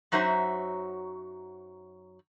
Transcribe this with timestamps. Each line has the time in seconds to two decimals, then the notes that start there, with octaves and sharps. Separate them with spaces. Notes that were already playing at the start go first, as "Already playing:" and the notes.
0.12 F#2 F#3 D#4 F#4 C5 E5